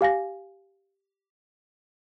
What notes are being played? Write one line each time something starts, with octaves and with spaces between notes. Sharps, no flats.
G4 F5 G#5 A#6